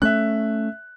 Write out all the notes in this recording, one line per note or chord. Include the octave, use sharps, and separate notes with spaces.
A3 C#4 E5 F#6